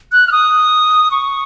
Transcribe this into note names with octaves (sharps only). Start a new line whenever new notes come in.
F#6
F6
D#6
C#6